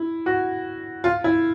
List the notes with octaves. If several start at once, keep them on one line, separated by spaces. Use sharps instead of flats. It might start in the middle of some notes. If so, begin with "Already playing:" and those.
Already playing: E4
F#4
F4
E4